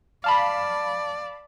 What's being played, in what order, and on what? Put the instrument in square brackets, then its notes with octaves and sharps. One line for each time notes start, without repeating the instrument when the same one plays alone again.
[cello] D5 [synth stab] F5 A5 B5